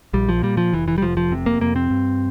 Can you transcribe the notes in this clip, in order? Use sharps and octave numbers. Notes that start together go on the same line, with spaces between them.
A#1 G3
F3
A#2 G3
F3
F1 E3
E3
G3
F1 F3
F3
C3
A#3
F2 A#3
C4
G2